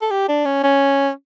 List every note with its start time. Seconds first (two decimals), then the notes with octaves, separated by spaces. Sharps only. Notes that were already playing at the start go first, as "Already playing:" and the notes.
0.02 A4
0.11 G4
0.28 D4
0.45 C#4
0.63 C#4